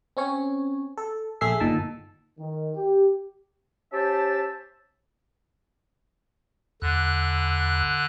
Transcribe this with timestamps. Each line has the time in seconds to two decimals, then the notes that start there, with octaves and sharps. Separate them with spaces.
0.17 C4 C#4 C#5
0.97 A4
1.41 A#1 A3 G#4 E5 C7
1.60 G1 A#2 D#3 A5 E6
2.39 D#3
2.75 G4
3.92 C#4 G4 C5 E5 A5
6.82 E2 D3 F#6